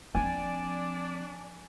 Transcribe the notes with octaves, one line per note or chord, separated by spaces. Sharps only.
F3 C4 D4 D5 G#5